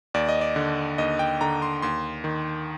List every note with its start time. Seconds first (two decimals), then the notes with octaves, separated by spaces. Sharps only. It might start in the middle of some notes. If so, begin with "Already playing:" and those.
0.14 D#2 D5
0.29 D#5
0.41 D5
0.56 D3
0.98 D#2 D#5
1.19 G5
1.41 D3 A#5
1.62 C6
1.82 D#2 C6
2.24 D#3